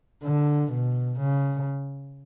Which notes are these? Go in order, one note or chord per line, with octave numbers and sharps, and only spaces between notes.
D3
B2
C#3